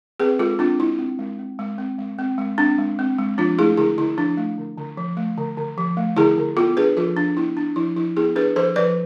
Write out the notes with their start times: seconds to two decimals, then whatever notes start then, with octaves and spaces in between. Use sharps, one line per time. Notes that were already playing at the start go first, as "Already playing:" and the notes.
0.20 C4 G#4 B4
0.39 G#3 F4 A4
0.59 C4 D4 F4
0.79 G#3 E4
0.99 C4
1.19 G#3
1.39 C4
1.59 G#3
1.78 C4
1.99 G#3
2.18 C4
2.38 G#3
2.58 C4 D4
2.78 G#3
2.99 C4
3.18 G#3
3.38 F3 D4 F4
3.58 A3 E4 G#4
3.77 D3 E4 G#4
3.98 D3 E4
4.17 F3 D4
4.37 A3
4.58 D3
4.78 D3
4.97 F3
5.17 A3
5.38 D3
5.57 D3
5.78 F3
5.97 A3
6.17 D3 E4 G#4
6.38 D3
6.57 B3 F4 A4
6.77 D4 G#4 B4
6.97 F3 F4 A4
7.17 F3 D4
7.37 B3 E4
7.57 D4
7.76 F3 E4
7.96 F3 E4
8.16 B3 E4 G#4
8.36 D4 G#4 B4
8.56 F3 A4 C5
8.76 F3 B4 D5